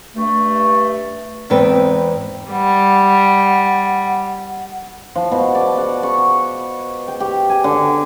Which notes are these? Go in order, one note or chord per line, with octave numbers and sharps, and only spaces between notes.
G2 A3
E2 G#2 C4 B4 G5
G3 F#5
F3
B2
D5
F#5
C#6
G5
G4
G#5
D3